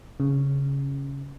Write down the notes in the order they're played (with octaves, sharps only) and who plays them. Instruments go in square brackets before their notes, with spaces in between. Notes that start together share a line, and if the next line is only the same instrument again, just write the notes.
[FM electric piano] C#3